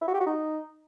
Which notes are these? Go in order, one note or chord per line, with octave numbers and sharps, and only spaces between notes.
E4
F#4
G4
F#4
D#4